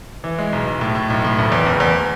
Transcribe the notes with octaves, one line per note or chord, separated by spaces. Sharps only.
E3
G#3
B1
B1
A2
A2
B1
A2
F#1
E2
F#1
E2